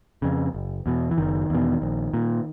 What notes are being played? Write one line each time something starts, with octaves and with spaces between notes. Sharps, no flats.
F2 C#3
F#1
E2 B2
E3
F#1 D#3
E2 B2
A#1
A#2